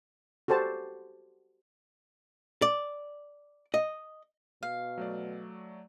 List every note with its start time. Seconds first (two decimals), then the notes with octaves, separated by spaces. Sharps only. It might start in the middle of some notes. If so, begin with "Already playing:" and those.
0.48 F#4 G4 A4 C5 A5
2.62 D5
3.74 D#5
4.63 B2 F5
4.98 F#3 A3 D5